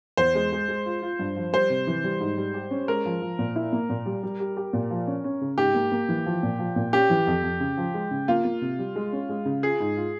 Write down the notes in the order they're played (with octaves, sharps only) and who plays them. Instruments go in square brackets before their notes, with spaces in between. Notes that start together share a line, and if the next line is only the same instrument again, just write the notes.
[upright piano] E2 [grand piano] C5
[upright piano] G#3
G#3
G#3
F4
F4
G2
F3
[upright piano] G3 [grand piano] C5
[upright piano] C3
E3
G3
G#2
G3
G4
C#4
[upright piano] G#3 [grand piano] A#4
[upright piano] F3
F3
A#2
E4
A#3
A#2
G3
G3
G4
G4
A#2
F3
C#4
C#4
C#3
[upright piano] G#2 [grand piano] G4
[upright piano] A#3
A#3
E3
F3
A#2
F3
A#2
[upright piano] C#4 [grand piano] G4
[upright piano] E3
F2
F2
C#3
F3
G#3
C#3
[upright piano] A#3 [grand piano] F4
[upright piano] A#3
C3
G3
G#3
C#4
G#3
C#3
[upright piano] F4 [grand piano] G#4
[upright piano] G#2
F4